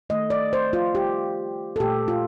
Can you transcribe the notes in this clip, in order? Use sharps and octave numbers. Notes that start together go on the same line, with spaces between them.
D#3 A3 D#5
D5
C5
F4
G4
A4
A#2 A3 G4
F4